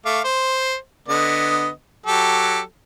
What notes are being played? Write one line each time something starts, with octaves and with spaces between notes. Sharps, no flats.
A3 F5 D6
C5
D3 B3 D#5
F#3 G4 A4